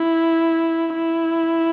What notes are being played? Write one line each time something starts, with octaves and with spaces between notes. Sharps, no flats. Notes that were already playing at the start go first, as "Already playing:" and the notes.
Already playing: E4
E4